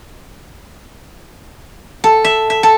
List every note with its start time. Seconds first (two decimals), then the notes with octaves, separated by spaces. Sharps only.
2.04 A4
2.24 E5
2.50 E5
2.63 A4